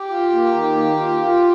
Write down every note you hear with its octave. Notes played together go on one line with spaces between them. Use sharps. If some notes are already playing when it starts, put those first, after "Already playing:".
Already playing: G4
F4
A#3
D#3
A#3
F4
F4